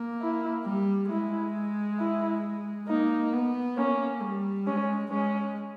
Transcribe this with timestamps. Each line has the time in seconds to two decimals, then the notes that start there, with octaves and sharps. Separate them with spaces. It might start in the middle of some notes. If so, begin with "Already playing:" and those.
Already playing: A#3
0.21 E4
0.65 G3
1.10 G#3 E4
1.99 E4
2.88 A#3 D#4
3.33 B3
3.77 A#3 C#4
4.22 G3
4.66 G#3 C#4
5.11 G#3 C#4